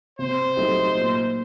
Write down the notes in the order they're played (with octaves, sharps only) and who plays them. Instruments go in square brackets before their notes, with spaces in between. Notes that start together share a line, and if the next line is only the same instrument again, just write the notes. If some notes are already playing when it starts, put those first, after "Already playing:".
[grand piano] C3 [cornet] C5
[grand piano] F#3 A3 D#4 G4
A#2